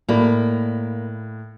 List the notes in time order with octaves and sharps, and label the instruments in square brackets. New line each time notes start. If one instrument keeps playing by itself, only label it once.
[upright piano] A2 D5 B5 [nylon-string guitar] A#3